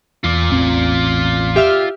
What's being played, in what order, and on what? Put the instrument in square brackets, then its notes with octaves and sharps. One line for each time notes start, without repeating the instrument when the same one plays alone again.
[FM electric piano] E2 [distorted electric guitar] F4 D5
[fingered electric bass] A1 C4
[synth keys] G4 E5 F6